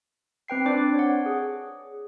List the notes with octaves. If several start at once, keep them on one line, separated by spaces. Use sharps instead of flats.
C4 B4 G5 C7
D4 C5 D5 D6 F#6
C#5 F#5
G#4